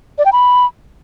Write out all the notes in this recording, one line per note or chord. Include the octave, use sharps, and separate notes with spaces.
D5
G5
B5